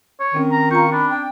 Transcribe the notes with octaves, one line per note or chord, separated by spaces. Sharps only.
C#5
D#3 C4 C#4
A#5
F4 A#5 C#6 G6
D4 B5
G5